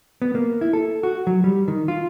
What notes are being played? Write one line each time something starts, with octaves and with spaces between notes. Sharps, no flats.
B3
A#3
E4
A4
F#4
F#3
G3
D#3
F4